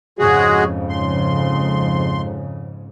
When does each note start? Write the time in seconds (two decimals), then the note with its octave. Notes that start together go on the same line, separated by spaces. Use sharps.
0.19 F2 G#2 C#3 G#3 F#4 G#4
0.90 C6